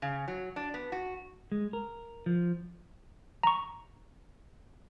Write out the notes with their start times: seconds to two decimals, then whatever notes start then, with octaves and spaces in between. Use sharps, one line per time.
0.02 C#3
0.28 F#3
0.56 D4
0.74 B3
0.92 F#4
1.52 G#3
1.73 A#4
2.26 F3
3.43 A#5 C#6